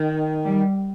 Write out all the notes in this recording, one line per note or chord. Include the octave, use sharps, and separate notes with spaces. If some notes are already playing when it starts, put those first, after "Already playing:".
Already playing: D#3
G3